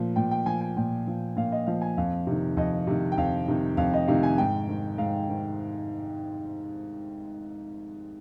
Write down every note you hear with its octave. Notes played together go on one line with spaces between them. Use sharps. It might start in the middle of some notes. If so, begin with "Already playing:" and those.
Already playing: A#2 F3
A#2 G5
G5
F3 G#5
G#5
A#2 G5
F3
A#2 F5
D#5
F3 F5
G#5
F2 F5
C3 D#3
F2 D#5
C3 D#3
G5
F2 F5
C3 D#3
F2 F5
D#5
C3 D#3 F5
G#5
G#2 G5
D#3
G#2 F5
D#3